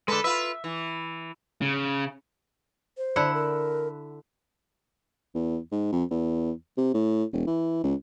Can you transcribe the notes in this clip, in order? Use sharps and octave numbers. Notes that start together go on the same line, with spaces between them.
D3 G#3 A4 B4
F4 B4 E5
E3
C#3
C5
D3 E4 F#5
A#4
E2
G#2
F2
E2
C3
A2
E1
E3
C#2